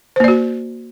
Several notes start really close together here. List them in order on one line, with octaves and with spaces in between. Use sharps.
C5 A#3 D5 F#4